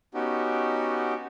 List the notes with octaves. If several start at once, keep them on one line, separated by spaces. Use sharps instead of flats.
B3 C#4 D#4 F#4 G4